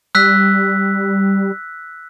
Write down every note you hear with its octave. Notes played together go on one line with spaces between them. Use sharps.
G3 E6 F#6 B6